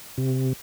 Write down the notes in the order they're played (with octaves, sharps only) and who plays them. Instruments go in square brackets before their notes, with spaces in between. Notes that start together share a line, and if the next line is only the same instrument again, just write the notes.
[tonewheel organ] C3